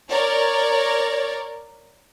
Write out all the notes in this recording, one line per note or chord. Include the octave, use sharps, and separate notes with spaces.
A#4 C#5 D5